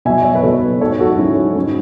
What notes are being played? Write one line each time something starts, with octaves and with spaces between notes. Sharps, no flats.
B2 F#3 E5 G#5
C#5 E5
B4
B2 F#3 A4 C#5
G#2 F#3 A4 C#5
F#4 A4
G#2 F#3 C#4 E4
G#2 F#3 C#4